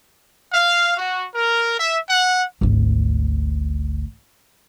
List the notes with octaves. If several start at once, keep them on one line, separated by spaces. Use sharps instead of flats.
F5
F#4
A#4
E5
F#5
G#1 D2